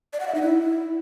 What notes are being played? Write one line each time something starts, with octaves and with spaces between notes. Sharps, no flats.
D5
F#5
E5
D#4
E4